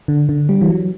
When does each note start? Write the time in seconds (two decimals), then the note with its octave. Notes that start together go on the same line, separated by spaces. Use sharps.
0.08 D3
0.29 D3
0.49 G3
0.61 E3
0.69 F#3